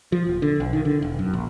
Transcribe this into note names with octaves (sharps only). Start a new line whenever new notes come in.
F3
D#1
D3
B1
D#3
D3
E1
F#2
A#1